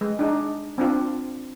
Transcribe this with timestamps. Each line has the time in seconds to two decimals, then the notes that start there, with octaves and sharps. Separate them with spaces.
0.01 G#3
0.19 D4 D#4
0.78 C4 D4 F4